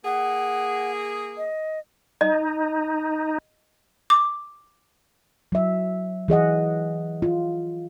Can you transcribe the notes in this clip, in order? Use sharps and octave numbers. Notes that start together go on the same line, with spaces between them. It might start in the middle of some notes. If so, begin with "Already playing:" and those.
A#3 G#4 F#5
D#5
D#4 D#5
D6
F#3 E5
E3 G#4 D#5 F#5
F4